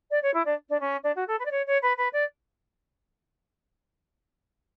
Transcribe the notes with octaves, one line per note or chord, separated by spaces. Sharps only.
D5
C#5
E4
D4
D4
C#4
D4
F#4
A4
B4
D5
C#5
C#5
B4
B4
D5